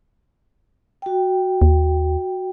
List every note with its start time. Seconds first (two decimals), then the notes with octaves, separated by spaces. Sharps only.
1.02 F#4 G5
1.62 D#2